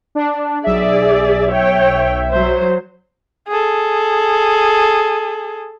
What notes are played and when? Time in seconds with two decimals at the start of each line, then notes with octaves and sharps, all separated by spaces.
0.15 D4
0.64 B1 G#4 D5 E5
1.52 C#5 G5
2.31 F#3 C5
3.48 G#4 A4